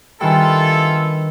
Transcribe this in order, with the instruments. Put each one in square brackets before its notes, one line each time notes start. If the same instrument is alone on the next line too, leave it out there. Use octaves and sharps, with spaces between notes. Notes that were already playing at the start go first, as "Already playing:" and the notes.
[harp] G2 D#3 B4 [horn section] E4 F4 A4 [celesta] G5 G#5